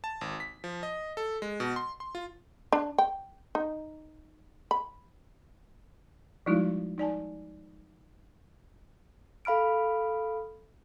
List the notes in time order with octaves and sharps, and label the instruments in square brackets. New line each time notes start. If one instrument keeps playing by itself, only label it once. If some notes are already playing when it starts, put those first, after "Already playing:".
[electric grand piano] A5
G#1
B6
F3
D#5
A4
G#3
B2
C6
C6
F4
[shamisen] D4
G5
D#4
B5
[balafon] F3 G3 G#3 D#4 E4 F#4
D#4 D5 G#5 A5
[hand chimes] A4 F5 B5 F6 D7